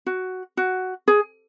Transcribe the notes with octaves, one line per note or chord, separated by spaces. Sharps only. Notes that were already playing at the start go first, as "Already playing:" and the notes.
F#4
F#4
G#4